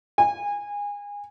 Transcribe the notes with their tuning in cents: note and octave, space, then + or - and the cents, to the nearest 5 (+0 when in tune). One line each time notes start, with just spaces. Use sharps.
G#5 -25